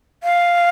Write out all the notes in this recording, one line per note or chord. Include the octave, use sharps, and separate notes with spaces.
F5